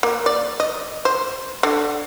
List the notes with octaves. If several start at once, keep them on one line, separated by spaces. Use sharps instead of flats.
A#3
D5
D#5
C5
D3